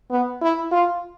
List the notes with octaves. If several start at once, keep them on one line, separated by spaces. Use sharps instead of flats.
B3
E4
F4